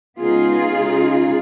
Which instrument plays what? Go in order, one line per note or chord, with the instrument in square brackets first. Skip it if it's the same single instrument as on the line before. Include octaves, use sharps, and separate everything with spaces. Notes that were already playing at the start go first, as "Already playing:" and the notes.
[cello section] C#3 G#3 B3 D#4 F4 G#4
C#3 G#3 D#4